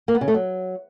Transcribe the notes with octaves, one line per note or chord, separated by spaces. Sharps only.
A#3
B3
C#3
A3
F#3